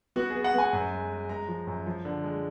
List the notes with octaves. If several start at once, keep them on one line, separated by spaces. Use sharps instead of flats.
B3 F#4
G#4
B3
F#5
B3 G#5
F#2
G#3
G#3
G#3 A#5
F3
F#2
F3
D3
G#3